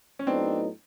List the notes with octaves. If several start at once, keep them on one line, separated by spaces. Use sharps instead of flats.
C#4
A2 F#3 B3 C4 D4 D#4